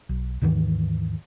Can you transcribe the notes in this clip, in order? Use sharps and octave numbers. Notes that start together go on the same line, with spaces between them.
B1
D#2 G#2 D#3 E3